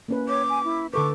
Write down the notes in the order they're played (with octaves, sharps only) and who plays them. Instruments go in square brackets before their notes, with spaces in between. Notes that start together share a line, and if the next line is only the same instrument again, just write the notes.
[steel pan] A#3 C#4 B4
[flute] C#5 [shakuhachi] D6
[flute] G#5
E4
[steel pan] D3 A4 B4 [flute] C#6 [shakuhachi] D6